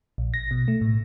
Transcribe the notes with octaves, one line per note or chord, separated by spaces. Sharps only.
A#1
A#6
B2
A3
A2